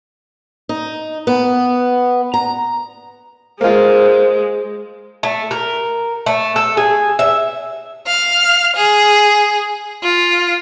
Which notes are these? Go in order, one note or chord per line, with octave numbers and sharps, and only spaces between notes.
D#4
B3
A#5
G#3 A#3 F4 C5
A3
A#4
A3
A4
G#4
E5
F5 F6
G#4
F4